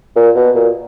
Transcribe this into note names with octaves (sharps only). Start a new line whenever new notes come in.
A#2
B2
A#2